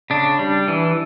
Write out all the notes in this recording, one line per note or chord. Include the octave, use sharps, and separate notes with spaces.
C#3 D4
G3
E3